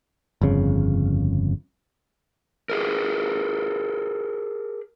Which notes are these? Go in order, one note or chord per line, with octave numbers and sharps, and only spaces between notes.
G1 F2 C#3
G4 G#4 A#4